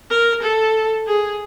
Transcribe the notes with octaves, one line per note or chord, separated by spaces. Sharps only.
A#4
A4
G#4